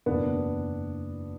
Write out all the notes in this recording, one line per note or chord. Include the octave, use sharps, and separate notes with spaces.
F#1 E2 B2 B3 D4